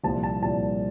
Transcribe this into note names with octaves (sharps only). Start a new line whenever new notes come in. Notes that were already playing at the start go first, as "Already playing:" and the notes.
C2 A#2 F3 A5
A5
C2 A#2 F3 A5